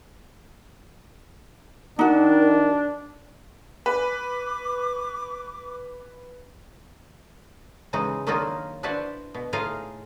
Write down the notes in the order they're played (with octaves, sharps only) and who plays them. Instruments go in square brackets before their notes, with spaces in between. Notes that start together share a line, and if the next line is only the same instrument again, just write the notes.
[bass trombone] D#3 [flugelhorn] D4 [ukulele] D#4 F#4 [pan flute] A#4
[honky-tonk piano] B4 [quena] D6
[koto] C#3 E3 G#3 D#4
D#3 F#3 A#3 D4 D#4 F4
D4 E4 F#4 B4 C5 D5
B2
A2 D#4 F4 G#4 D#5 F5